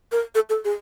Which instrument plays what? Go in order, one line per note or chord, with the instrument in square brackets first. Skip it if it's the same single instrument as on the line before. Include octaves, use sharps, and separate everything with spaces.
[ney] A#4
A4
A4
G#4